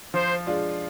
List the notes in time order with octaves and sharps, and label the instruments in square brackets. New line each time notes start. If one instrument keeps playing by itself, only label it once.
[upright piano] F3 [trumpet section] C5
[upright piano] G#3 D4 F4